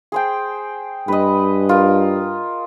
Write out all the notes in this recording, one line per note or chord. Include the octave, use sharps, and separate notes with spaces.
G#4 C5 G5
G2 B4 D#5
F4 A#4